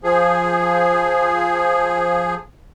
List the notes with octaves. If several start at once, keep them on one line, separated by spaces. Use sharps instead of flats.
F3 G#4